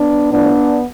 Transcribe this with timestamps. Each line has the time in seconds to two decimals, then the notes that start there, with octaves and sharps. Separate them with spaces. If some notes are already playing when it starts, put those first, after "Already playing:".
Already playing: B3 D4
0.31 A2 F3 B3 D4